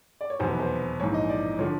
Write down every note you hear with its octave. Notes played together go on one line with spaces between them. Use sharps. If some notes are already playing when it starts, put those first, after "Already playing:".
D5
C#5
F1 E2 B2 F#3 C5
B4
C5
A#1 G#2 E3 C#5
D#5
D5
D3 F3 C#5